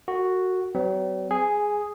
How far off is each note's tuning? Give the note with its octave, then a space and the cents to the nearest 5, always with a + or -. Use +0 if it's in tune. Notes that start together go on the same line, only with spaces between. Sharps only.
F#4 +0 A#4 -45
F#3 +45 C4 -40
G#4 +0 G#5 -20